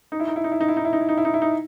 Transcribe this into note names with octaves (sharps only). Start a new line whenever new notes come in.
D#4
E4
D#4
E4
D#4
E4
D#4
E4
D#4
E4
D#4
E4
D#4
E4
D#4
E4
D#4